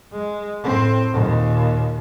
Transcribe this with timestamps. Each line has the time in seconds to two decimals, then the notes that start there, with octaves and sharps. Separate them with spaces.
0.13 G#3
0.64 A2 C4
1.13 D#2 A#2